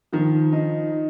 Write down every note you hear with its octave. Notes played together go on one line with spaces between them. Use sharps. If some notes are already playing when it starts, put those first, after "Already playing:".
D#3 F3
D#4